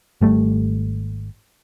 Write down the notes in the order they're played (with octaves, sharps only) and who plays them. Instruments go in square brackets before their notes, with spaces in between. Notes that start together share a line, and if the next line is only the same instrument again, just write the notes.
[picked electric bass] G#1 G3 A3